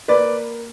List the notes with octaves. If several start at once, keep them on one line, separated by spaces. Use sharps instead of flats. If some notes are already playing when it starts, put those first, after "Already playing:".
A#3 B4 D5